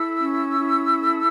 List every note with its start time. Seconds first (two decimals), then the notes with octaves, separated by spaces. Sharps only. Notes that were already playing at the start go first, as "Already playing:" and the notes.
Already playing: E4 A4 E6
0.19 C#4
0.59 E4
0.99 A4